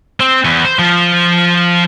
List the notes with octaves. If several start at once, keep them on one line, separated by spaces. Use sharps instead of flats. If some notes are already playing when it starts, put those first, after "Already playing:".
C4
E2
C5
F3